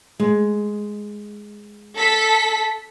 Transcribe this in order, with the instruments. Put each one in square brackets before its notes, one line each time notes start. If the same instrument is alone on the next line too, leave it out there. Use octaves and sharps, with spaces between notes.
[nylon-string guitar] G#3
[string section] A4 B6